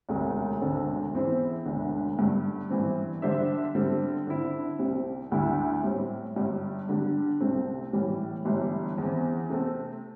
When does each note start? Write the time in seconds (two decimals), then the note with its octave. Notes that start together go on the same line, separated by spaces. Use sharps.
0.09 E1 D2 C3 A3
0.61 E1 D2 D3 C4 A4
1.13 E2 E3 C4 E4 C5
1.65 E1 D2 D3
2.18 G2 D3 A3 D4
2.70 G2 E3 C4
3.22 D3 G3 D4 C5 E5
3.75 D3 G3 C4 A4
4.27 D3 C4 E4
4.79 C2 C3 G3 C4
5.32 D2 D3 G3 E4
5.83 A2 G3 C4
6.36 G1 G2 G3
6.89 D3 G3 D4
7.40 C2 C3 A3 C4
7.93 A2 E3 G3
8.45 G1 G2 E3 G3
8.98 E2 E3 C4
9.50 C3 A3 C4 A4